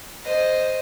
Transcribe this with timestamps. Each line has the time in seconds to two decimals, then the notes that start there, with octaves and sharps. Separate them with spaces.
0.24 C5 D#5